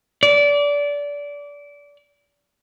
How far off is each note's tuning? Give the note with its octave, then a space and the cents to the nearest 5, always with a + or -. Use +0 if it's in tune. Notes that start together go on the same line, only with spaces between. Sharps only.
D5 -25